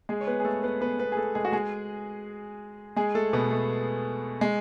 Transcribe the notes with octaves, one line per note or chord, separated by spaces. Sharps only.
G#3 G#4
C#5
B3 B4
G#4
A3 A4
B3 B4
B3 B4
B3 B4
G#4
A3 A4
G#3 G#4
F#4
G#3 G#4
G#3 G#4
A3 A4
B2 B3
A3
G#3